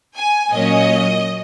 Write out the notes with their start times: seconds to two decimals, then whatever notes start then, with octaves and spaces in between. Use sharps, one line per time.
0.16 G#5
0.52 A#2 F#3 A#3 C#4 D#5